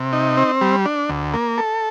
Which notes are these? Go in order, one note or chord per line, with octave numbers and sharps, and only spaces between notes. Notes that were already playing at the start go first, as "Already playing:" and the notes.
Already playing: C3
D#4
C4
G3
D4
D2
A#3
A4